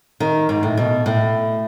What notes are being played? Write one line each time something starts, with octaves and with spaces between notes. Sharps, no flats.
D#3
G#2
A2
B2
A2